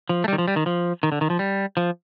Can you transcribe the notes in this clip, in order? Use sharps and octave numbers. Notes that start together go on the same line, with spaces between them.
F3
A3
G3
D#3
F3
G3
D#3
F3
D#3
D3
D#3
F3
G3
F3